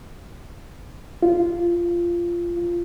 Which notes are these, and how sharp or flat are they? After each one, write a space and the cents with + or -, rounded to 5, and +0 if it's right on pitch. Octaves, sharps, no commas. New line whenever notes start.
F4 -15